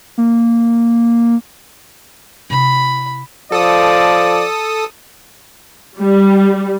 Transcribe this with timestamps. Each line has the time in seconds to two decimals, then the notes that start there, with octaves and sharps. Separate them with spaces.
0.18 A#3
2.50 C3 E4 B5
3.52 F3 A4 D5 D#6
6.00 G3